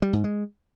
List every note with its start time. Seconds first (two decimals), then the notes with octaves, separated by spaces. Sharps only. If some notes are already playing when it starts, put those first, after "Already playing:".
0.02 G3
0.13 G#2
0.24 G#3